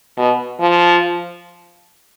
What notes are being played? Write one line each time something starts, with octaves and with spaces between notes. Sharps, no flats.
B2
F3